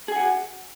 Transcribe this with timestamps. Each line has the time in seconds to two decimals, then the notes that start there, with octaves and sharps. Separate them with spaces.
0.08 G#4
0.12 G#5
0.16 F#5
0.20 F#4